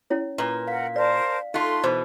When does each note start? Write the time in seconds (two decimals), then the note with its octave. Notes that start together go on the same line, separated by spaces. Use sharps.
0.10 C#4 E4 C#5
0.38 A#2 B4
0.67 A#4 F5 F#5 B6
0.96 A#4 C5 D5 A5
1.54 A3 D#4 F4 C6 F#6 B6
1.84 B2 E3 C5